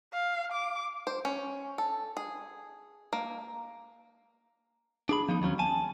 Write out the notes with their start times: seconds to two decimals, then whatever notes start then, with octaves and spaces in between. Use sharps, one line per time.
0.13 F5
0.52 D6
1.07 C5
1.25 C#4
1.78 A4
2.17 G#4
3.13 A#3
5.09 D4 G#4 B5
5.29 F3 B3 D#4
5.42 D#2 F#3 C4 C#4
5.59 G#5 A5